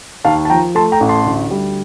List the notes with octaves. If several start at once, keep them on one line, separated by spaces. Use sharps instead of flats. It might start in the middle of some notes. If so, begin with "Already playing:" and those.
D#2 F5 A5
A5
F3 G5 A#5
A3 A5 C6
G5 A#5
A1
A5 C6
D2
G3